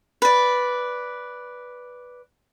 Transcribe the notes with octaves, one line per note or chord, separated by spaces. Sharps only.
B4 D5